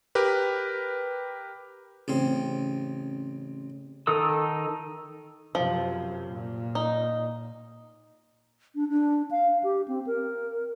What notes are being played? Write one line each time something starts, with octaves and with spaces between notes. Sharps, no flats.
G4 A#4 B4
A1 C#3 C4
D#3 D#4 A4 D#6 E6
F#2 C3 F3
A#2
D#4
D4
D4
F5
G4
C4
A#4